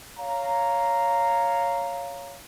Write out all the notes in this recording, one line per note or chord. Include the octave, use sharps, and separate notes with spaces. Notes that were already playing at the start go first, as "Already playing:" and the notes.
C#5 F5 A#5